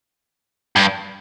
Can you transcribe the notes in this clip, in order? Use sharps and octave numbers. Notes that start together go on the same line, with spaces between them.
G2